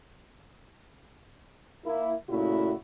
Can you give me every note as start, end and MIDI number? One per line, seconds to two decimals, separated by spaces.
1.85 2.12 58
1.85 2.12 64
2.30 2.74 46
2.30 2.74 49
2.30 2.74 57
2.30 2.74 64
2.30 2.74 66